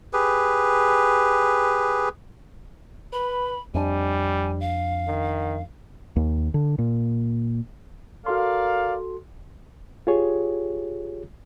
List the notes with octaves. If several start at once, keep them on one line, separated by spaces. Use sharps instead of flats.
G4 G#4 B4
B4 B5
F2 G3 D4 G#5
F5
D#3
D#2
D3
A#2
F#4 A4 A#4 D5 F5 C6
F4 G4 G#4 C#5